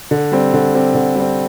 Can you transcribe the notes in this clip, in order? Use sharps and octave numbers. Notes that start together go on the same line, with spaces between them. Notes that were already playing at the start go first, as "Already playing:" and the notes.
D3
G3 C4
D3
G3 C4
D3
G3 C4